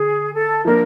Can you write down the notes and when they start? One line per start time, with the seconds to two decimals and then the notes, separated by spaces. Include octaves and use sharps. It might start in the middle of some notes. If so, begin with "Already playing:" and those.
Already playing: D3 G#4
0.34 A4
0.64 F3 A#3 D4 A#4